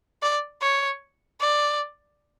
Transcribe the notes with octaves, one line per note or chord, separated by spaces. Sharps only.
D5
C#5
D5